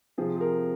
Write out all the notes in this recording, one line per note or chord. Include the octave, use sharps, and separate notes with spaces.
C3 F3 C4 G#4
G#4
A#4